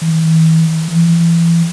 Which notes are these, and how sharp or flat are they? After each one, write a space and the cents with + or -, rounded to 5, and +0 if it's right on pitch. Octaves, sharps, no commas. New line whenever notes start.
E3 -40
E3 +30